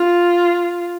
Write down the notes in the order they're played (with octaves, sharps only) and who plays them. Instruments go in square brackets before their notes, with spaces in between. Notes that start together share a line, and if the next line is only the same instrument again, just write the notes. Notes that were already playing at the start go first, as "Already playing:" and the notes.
Already playing: [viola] F4